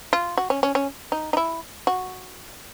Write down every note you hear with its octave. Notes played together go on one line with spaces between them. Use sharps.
F4
F#4
C#4
C#4
C#4
D#4
D#4
E4
F#4